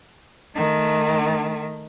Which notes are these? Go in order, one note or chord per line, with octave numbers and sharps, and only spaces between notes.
D#3 A3